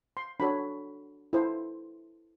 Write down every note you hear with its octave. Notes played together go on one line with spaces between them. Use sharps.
C6
D4 F#4 A4 C#5 B5
E4 A4 C5